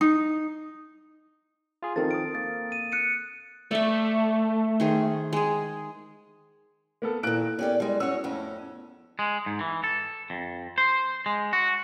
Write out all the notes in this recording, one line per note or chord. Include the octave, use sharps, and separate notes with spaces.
D#4
F4 G#4
D#3 F3 C4 A4 A#4 A6
D#6 D7
A#3 A6
D#7
F#6 C#7 D#7
A3 D5 E5
D#3 G#4 C5
G#3 G#4
A#3 B3 A4
A#2 D#3 E4 A4 F#6 D7
B3 C#4 E4 G4 A#4 D5
G3 G#3
C#4 F#4 C#5 E6
F2 A2 C#4
G#3
G#2
E3
A4
F2
C5
G#3
F#4